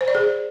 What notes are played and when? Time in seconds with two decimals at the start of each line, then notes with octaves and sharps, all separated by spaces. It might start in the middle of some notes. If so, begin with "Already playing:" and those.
0.01 C5
0.08 D5
0.15 G#4